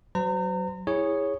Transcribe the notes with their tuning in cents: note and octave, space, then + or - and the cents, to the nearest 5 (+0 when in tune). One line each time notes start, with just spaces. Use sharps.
F#3 +20 C5 -40 A#5 -35
E4 -10 G#4 -15 C#5 +0